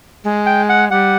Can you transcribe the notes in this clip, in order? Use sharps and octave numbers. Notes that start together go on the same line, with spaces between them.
G#3
G5
F#5
G3 F#5